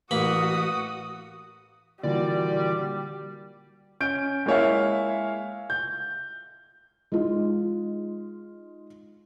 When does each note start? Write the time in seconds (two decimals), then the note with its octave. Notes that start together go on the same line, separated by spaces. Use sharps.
0.11 A1 A#3 F#4 B5 D#6
2.03 A#2 D3 E3 G3 F#4 D5
4.00 C#4 G6 D7
4.46 G#3 A#3 E4 C#5 E5 F5
5.70 G6
7.12 G#3 D#4 F4